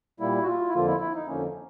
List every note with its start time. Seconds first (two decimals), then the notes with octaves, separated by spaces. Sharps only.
0.20 A#2 G3 A#3 E4
0.42 F#4
0.47 F4
0.69 E4
0.74 F2 D3 F3 A#3 F4
0.87 E4
1.00 E4
1.15 D#4
1.28 F2 D3 F3 A#3 C#4